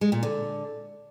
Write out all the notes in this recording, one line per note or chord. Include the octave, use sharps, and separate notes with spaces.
G#3
A#2
D3